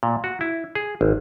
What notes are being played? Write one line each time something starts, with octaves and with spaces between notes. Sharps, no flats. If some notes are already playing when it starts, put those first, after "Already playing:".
A#2
F#4
E4
G#4
G#1